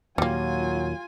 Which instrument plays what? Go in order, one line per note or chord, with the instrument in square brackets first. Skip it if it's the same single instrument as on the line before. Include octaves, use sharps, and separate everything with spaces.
[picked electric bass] D#2 A#2 [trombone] F#3 [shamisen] G3 A#3 [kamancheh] F4 G#5